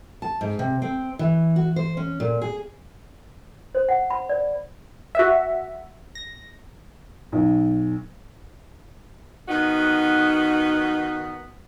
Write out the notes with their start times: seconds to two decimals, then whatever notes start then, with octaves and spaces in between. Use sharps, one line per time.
0.22 A5
0.41 G#2
0.59 C3
0.82 C4
1.19 E3
1.56 F#4
1.76 C5
1.97 C#4
2.20 A#2
2.42 G#4
3.75 C5
3.89 F#5
4.10 B5
4.29 D5
5.15 F#4 E5
6.15 A#6
7.32 B1
9.48 D#3 B3 D#4 F#4